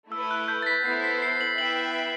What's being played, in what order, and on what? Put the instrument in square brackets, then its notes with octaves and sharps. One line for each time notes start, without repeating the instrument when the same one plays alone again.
[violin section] A3 E4 B4 [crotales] E6
[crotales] F#6
G6
A6
B6
[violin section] B3 E4 A4 C5 [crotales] C7
[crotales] B6
C7
F#7
[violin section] B3 E4 B4 E5 G5 [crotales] F#7